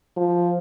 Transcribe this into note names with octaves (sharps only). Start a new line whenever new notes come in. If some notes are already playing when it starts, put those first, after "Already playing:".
F3